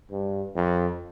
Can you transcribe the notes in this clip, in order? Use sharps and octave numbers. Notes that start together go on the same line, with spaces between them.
G2
F2